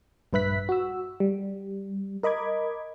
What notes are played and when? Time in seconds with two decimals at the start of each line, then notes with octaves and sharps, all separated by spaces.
0.33 A#1 G2 B4 E5 F#6 B6
0.69 F#4 E6
1.20 G3
2.23 A#4 D#5 B5 D6 G#6